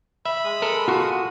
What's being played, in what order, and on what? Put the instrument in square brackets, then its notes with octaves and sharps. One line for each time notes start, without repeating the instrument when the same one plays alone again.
[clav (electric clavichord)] E5 [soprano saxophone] B5
[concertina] G#3 D#6
[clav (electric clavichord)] A4 A#4
[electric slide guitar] F4 F#4